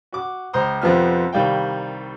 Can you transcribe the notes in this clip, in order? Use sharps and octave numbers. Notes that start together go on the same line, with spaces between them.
F#4 D6
C#2 C5 A#5 C6 D#6
F2 C3 F3 B3 F4 F6
C2 D#3 G3 F5 G5